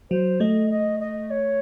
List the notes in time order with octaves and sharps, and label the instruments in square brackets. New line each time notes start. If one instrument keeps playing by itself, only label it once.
[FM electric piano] F#3 [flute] C5
[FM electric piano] A3 [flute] D#5
[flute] D#5
D#5
C#5